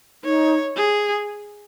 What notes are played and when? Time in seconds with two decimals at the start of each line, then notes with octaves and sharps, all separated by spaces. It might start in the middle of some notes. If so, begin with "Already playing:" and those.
0.24 D#4 C#5
0.76 G#4